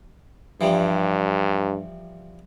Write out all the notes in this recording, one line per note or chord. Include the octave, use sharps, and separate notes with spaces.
G2 E3 F3 G3